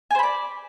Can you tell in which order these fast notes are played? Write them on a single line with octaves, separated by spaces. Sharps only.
G#5 C5 B5 D5